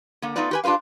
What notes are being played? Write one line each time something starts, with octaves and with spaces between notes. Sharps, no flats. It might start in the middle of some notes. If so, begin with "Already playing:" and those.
D3 A#3
A3 B3 D#4 F4 B4 D5
G4 B4 G#5
D4 F4 G4 B4 F5